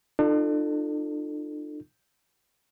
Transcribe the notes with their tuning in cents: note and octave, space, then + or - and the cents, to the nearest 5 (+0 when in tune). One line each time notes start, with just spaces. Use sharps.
D4 +45 F4 -15 A4 +10